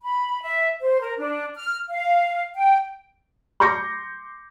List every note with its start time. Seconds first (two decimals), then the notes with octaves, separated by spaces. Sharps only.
0.01 B5
0.41 E5
0.81 C5
1.01 A#4
1.19 D4
1.55 F6
1.90 F5
2.55 G5
3.60 C6 D6 G6 A#6 C#7